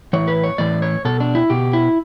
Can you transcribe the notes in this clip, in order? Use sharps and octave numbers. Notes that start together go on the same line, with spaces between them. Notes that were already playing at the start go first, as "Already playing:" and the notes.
A2 E3 C#5
B4
C#5
A2 E3 D5
C#5
B2 A4
D4
E4
B2 G4
E4